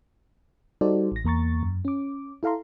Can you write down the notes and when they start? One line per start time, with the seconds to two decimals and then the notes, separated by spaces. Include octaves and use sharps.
0.81 G3 D#4 F#4 A4 C5 D5
1.12 A1 A#6
1.24 E2 A#3 A#5 C#6 A6
1.63 F#2
1.85 C#4 D6
2.43 E4 A4 F5 A#5 C6